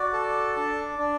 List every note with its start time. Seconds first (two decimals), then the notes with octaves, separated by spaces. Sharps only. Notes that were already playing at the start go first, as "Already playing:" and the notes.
Already playing: F#4 D5
0.13 A4
0.56 D4
0.99 D4